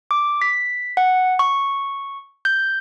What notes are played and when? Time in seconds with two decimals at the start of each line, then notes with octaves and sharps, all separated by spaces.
0.11 D6
0.42 B6
0.97 F#5
1.39 C#6
2.45 G6